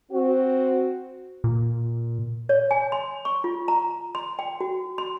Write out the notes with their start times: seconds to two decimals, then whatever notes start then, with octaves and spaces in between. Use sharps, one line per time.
0.12 C4 F#4
1.44 A#2
2.49 C#5
2.71 G#5
2.92 C6
3.25 C#6
3.44 F4
3.68 A#5
4.15 C6
4.39 G5
4.61 F#4
4.98 C6